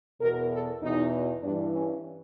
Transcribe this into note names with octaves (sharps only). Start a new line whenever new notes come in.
E2 B2 A#4
A4
E2 B2 D#4
G2 E3 D4
C#4